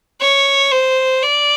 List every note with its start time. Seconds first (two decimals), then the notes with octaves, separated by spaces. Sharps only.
0.21 C#5
0.72 C5
1.23 D5